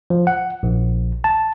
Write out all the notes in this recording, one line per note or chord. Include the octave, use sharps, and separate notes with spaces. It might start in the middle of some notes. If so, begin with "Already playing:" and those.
F3
F#5
A#1
A5